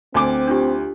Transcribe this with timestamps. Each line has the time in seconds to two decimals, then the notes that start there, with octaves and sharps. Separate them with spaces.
0.14 D2 C4 G#5 D6
0.48 D4 F4 G4